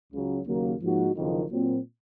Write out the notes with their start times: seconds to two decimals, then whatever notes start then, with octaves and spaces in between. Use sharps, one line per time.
0.12 C#2 C#3 F#3
0.46 D#2 C#3 F#3 A#3
0.81 G#2 F3 A#3 D#4 F#4
1.15 F#1 F2 D#3
1.50 A#2 F#3 C4